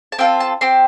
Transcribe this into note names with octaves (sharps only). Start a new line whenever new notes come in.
A5
C4 F4 A4 G5
A5
C4 G4 C6